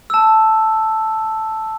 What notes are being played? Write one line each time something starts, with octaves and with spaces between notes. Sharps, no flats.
A5 E6